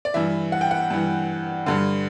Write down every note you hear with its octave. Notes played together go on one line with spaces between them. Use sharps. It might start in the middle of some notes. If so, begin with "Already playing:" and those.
D5
G2 E3 E5
F#5
G5
F#5
G2 E3
G2 D3